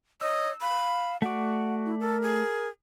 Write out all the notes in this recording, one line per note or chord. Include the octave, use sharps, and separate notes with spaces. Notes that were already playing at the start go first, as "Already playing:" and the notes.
C#5 D#5 E6
F5 B5
A3 F#4 D5 F#5
E4
A4 A#4
G#4